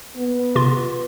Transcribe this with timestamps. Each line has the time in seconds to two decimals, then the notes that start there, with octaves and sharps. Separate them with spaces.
0.16 B3
0.56 C3 F4 C6